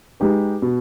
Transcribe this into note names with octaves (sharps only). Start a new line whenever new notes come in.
G#3 D#4 G4 B4
B2